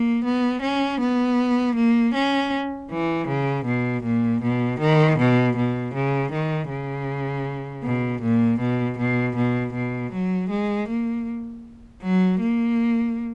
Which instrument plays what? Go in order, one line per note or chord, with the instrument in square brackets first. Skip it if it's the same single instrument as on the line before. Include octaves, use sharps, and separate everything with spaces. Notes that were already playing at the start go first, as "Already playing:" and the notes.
Already playing: [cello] A#3
B3
C#4
B3
A#3
C#4
E3
C#3
B2
A#2
B2
D#3
B2
B2
C#3
D#3
C#3
B2
A#2
B2
B2
B2
B2
F#3
G#3
A#3
F#3
A#3